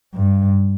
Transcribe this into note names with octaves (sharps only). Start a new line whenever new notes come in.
G2